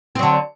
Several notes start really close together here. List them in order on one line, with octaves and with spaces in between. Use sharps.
C4 F#3 D3